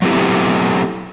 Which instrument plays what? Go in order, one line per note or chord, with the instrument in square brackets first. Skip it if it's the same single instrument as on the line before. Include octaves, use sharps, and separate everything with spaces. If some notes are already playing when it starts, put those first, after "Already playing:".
[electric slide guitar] F#3 A3 B3 C4 E4 G4